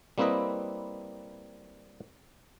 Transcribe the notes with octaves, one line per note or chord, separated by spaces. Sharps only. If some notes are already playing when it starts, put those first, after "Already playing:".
G3 A#3 C4 E4 B4 D#5